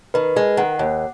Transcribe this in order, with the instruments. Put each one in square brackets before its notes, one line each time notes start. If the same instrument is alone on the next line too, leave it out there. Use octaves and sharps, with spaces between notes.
[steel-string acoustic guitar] D#3 [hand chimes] B4
[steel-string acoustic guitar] G#3
[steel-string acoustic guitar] D#3 [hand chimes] F#5
[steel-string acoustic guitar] D#2